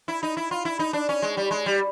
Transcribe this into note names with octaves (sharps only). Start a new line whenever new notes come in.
E4
D#4
E4
F4
E4
D#4
D4
C#4
G#3
G3
G#3
G3